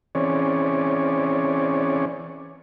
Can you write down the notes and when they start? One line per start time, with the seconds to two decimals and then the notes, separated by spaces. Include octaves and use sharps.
0.15 E3 C4 C#4 G#4 C#5 D5